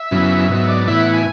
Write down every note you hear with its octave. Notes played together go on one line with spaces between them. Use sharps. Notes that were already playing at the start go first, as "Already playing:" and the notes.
Already playing: E5
F#2 C#3 F#3 B3 E4
G#2 F#3 B3 E5
D5
A2 E3 B3 E4 E5
F#5
G#5